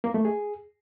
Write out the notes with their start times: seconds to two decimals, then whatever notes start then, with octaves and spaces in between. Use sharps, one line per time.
0.04 A#3
0.14 A3
0.25 G#4